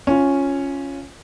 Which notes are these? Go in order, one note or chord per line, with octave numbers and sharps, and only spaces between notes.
C#4 F4